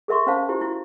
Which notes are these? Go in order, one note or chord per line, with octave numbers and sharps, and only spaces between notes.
G#4 A#4 E5 C6 C#6
C#4 C5 F5 A5
E4 G4 C5
E4 F#4